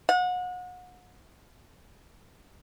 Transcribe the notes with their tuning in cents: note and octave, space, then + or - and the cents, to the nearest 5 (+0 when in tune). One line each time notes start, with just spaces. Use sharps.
F#5 -35